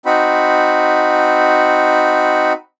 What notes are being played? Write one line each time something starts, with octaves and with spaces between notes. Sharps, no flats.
C4 D#4 F#4 B5